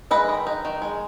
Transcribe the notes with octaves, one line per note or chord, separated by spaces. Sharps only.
G#3 B4 D#5
D#3
D#4
D#3
G#3